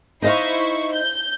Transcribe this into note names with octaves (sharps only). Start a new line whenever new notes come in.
D#4 E4 C5 D#5 F5 C#6
G6